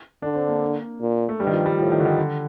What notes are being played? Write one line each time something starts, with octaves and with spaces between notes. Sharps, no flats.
D3 D4
C4
A#3
A#2
A3
G2 G3
D#3
F3
G3
A2 F3
D#3
D3
D#3
D3